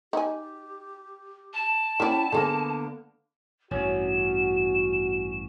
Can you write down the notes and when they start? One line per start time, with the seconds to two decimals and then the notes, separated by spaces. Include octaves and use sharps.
0.13 D#4 G4 G#5
1.53 A5
2.00 A#3 C#4 E4 D5 F#5 G5
2.32 D3 A#3 B3 G#4 G#5
3.71 A1 G2 C#4 F#4 E7